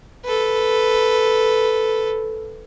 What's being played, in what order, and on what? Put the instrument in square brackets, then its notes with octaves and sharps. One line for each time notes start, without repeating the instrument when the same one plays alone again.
[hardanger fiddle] A4 B4